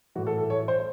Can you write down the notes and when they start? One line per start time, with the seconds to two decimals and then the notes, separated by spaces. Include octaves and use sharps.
0.15 A2 E3 F#4
0.27 A4
0.38 A4
0.50 C#5
0.68 C5